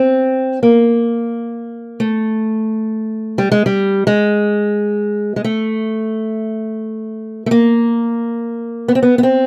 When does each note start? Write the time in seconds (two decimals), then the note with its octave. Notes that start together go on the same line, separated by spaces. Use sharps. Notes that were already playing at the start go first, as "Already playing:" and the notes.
Already playing: C4
0.63 A#3
2.00 A3
3.38 G3
3.52 G#3
3.66 G3
4.07 G#3
5.36 G#3
5.44 A3
7.46 A3
7.51 A#3
8.88 B3
8.95 C4
9.03 B3
9.18 B3
9.23 C4